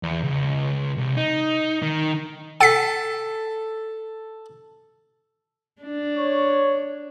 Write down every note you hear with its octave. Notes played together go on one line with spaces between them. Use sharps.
E2
C#2
C2
D#4
D#3
A4 F#5 B6
D4
C#5